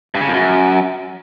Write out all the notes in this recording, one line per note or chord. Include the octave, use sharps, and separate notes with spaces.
G2
C#3
F2
F#2